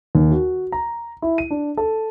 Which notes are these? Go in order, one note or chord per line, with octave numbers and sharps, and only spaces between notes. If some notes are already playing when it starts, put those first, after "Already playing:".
D#2
F#4
A#5
E4
D#7
D4
A4